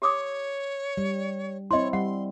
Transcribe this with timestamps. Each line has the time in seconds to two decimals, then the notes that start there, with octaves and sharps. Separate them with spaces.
0.02 G4 C#5 D6 D#6
0.97 G3
1.71 C4 E4 C#5 D#5 C6
1.93 G3 F#5 C6